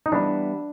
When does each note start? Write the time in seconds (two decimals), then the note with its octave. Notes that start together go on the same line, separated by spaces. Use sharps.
0.06 D#4
0.11 E3 G3 B3 D4 E4